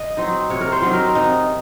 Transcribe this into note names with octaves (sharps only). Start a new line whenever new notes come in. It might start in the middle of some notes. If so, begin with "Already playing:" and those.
Already playing: D#5
F#3 C4 D#4
C3 C#5
A#4
C5
F#3 C4 D#4
A#4
C3 D#4